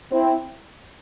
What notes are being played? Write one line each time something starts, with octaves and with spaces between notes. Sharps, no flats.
C4 E4